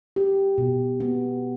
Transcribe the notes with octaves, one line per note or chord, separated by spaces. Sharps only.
G4
B2
B3